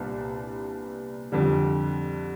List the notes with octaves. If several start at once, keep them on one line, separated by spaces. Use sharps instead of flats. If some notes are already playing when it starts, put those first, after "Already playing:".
Already playing: C2 A#2 G3 B3 D4
F2 D3 G3